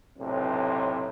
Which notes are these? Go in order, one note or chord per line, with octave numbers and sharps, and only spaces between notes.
B1 A2 C3